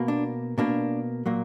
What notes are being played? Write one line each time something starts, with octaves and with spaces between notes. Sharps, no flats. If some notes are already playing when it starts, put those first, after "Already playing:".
Already playing: B2 A#3
D4
B2 A#3 D4
A#2 F#3 A#3